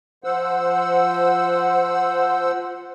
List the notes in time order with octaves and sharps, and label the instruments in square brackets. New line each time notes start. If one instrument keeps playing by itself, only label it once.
[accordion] F3 C5 F#5 E6